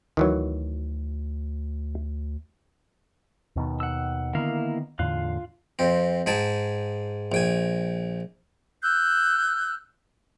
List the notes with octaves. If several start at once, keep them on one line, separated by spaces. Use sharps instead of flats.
D2 D#3 E3 F#3
D#2 B2 D#3
F#5 E6
D3 D#3 A#3 B3 E4 F5
E2 A2 D3 F4 F5 F#6
F2 C4
G#2 G#4 G5 A5
A#1 G5 G#5
E6 F#6 G6